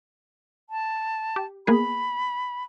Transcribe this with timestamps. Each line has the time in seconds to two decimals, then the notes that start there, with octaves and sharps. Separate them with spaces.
0.70 A5
1.36 G4
1.67 A#3 B3 G#4 B5